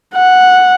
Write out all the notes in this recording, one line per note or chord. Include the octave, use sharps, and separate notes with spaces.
F#5